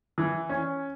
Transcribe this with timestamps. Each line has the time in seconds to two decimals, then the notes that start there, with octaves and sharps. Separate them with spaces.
0.18 E3
0.49 C#4